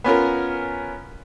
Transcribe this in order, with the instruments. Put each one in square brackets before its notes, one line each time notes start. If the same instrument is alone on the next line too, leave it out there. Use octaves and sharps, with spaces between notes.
[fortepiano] B3 C#4 F4 A#4